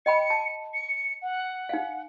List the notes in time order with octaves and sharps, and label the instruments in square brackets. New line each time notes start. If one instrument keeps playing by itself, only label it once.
[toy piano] D#5 G5 B5 [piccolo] C#7
[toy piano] A5
[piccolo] C#7
F#5
[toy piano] D#4 F5